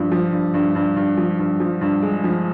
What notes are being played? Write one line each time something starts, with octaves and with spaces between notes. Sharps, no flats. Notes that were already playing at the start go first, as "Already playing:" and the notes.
Already playing: G2 F3
F3
G2
G2
G2
G2
F3
G2
F3
G2
G#3
F3